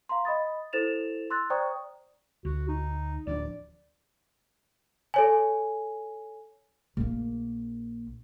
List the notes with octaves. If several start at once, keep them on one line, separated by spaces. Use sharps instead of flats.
F5 A#5 C6
D#5 B5 D#6 A6
E4 A4 C5 A6 E7 F7
C6 E6 F#6 A6
C5 D5 G5 A#5 C#6 D#6
D2 F#4
D#4
D1 F3 D4 D5
A4 C#5 G#5
A#1 A#3